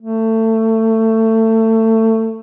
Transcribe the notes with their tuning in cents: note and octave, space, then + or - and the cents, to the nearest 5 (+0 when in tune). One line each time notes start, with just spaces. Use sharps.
A3 +25